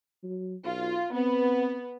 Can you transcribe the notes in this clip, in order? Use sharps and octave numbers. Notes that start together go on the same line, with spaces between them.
F#3
B1 F4
B3 C4